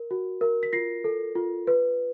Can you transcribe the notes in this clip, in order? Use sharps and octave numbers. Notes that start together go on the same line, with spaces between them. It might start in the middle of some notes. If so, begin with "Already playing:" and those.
Already playing: A#4
F#4
A#4
B6
F4 A#6 C7
A4
F4
B4